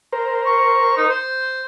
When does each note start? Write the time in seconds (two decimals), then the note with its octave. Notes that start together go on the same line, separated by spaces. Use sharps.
0.12 A#4 C5
0.46 C#6
0.97 D#4
1.09 C5